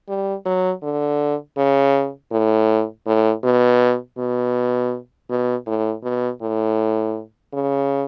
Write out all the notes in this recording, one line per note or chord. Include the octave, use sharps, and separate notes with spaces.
G3
F#3
D3
C#3
A2
A2
B2
B2
B2
A2
B2
A2
C#3